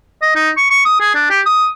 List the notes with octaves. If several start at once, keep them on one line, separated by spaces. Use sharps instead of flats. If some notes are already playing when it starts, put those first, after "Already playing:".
D#5
D#4
C#6
C#6
D#6
G#4
D4
G4
D#6